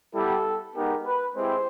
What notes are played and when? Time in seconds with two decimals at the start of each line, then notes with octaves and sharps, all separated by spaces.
0.14 G3 B3 E4 G4 A4
0.74 G#3 B3 D#4 G4 A#4
1.04 B4
1.34 G#3 C4 E4 G4 C5